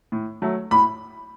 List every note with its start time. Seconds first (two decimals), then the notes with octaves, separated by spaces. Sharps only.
0.12 A2
0.42 F#3 A3
0.71 A2 B5